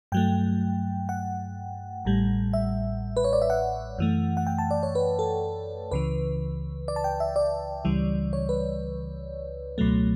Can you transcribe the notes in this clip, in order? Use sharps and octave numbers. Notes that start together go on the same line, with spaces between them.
G2 F#3 A3 G5
F#5
A1 A2 G3
E5
B4
C#5
D5
E5
F#5
F#2 E3 A3
F#5
G5
A5
D5
C#5
B4
A4
C#2 C#3 E3 B4
D5
A5
G5
E5
D5
C#2 C#3 E3 G3
C#5
B4
C#2 B2 F#3 A3